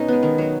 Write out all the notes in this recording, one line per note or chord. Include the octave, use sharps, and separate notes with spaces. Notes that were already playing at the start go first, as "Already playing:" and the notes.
Already playing: B2 C#4 D#4
G#3 B3
D#3
F#3 B3